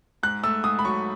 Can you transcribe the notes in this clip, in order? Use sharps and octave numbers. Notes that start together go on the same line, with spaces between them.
G#2 F#6
A3 E6
G#2 D#6
B5
F#3 C#6